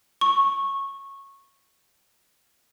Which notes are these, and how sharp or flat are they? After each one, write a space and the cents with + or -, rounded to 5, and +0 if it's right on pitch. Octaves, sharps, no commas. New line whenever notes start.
C#6 -15